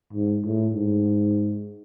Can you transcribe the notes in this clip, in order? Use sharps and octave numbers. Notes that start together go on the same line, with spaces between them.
G#2
A2
G#2